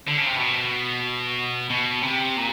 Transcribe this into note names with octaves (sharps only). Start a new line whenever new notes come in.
D3
C#3
C3
B2
B2
C3
A#2